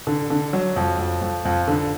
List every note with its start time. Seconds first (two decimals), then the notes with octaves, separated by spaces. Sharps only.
0.07 D3
0.30 D3
0.53 F#3
0.76 F2
0.99 F2
1.22 F2
1.45 F2
1.68 D3